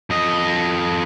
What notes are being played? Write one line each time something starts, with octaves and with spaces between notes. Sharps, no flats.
F2 D#5